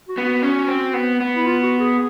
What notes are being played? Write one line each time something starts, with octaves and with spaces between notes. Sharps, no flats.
F#4
B3
F#4
C#4
C4
B3
B3
E4
F4
F#4
G#4